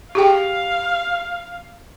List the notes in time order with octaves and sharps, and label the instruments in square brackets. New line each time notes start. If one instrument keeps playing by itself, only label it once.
[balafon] G4 G#4 G5 [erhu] F5